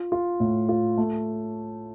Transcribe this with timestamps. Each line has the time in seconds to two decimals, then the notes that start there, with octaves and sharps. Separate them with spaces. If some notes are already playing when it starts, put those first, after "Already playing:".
Already playing: F4
0.12 F4
0.40 A2
0.69 F4
0.98 A3